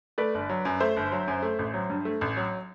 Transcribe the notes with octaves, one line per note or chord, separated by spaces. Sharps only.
A3 B4 D5
G1
F#3
F#2
A3 C5 E5
G1
F#3
F#2
A3
A1
F#3
G2
A3
A1
F#3